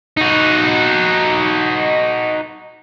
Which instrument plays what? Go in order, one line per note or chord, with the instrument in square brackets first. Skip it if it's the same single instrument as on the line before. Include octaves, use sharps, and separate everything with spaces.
[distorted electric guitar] D#4 F#4